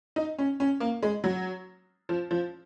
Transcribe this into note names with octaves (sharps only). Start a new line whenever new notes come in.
D#4
C#4
C#4
A#3
G#3
F#3
F3
F3